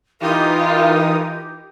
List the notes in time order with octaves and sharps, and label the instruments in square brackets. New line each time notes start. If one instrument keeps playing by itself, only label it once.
[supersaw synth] E3 D#4 D#6 [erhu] F4 [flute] G4 [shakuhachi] A#4